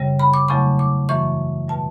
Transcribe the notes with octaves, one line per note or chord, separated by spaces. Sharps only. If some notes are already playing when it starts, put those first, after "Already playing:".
Already playing: F#2 C#3 G3
B5
D6
E2 C#3 F#3 A3 C#6
D6
F#2 E3 A3 C#6
B2 G3 A5